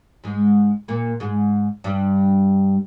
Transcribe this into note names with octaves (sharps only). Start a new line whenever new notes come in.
G#2 G#3
A#2 A#3
G#2 G#3
G2 G3